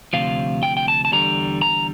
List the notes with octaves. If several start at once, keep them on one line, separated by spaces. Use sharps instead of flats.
D2 C3 F3 F5
G5
G5
A5
A5
E2 D3 G3 A#5
A#5